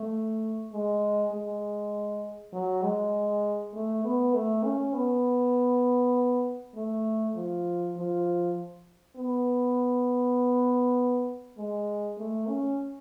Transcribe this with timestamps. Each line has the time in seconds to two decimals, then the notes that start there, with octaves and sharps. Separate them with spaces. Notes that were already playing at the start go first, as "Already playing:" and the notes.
Already playing: A3
0.73 G#3
1.32 G#3
2.53 F#3
2.83 G#3
3.74 A3
4.05 B3
4.34 A3
4.64 C#4
4.94 B3
6.75 A3
7.35 F3
7.96 F3
9.16 B3
11.58 G#3
12.18 A3
12.48 C#4